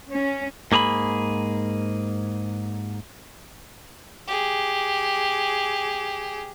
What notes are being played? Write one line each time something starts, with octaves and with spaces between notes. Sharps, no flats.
C#4
G#2 A#3 G#4 A#5 B5
G4 G#4